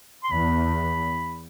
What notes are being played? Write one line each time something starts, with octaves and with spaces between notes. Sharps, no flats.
C6
E2 B5